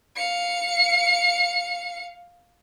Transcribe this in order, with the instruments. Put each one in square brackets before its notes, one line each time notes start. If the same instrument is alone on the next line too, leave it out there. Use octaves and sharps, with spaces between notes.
[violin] F5 C#7